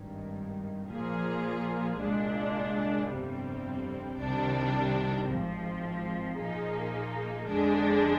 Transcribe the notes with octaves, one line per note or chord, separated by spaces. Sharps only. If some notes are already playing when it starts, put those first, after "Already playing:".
Already playing: G#1 G2 D#3
A#2 F3 A#3 F4 G#4
C2 A#2 G#3 D4
G1 F2 C3 G3 C4
C2 C3 D#3 G3 D4
G#1 G#2 F3 C4
A#2 F3 A#3 D#4 G#4
F2 D3 G#3 D4 G#4